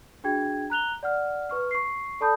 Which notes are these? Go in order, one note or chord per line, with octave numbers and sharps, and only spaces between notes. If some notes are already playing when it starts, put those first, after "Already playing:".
D4 F#4 G#4 G5 G#6
A#5 F#6 F7 G7
D5 F#5 F6
B4 C#6 F6
C#6 C7
A4 D5 A5 B5 D#6 G6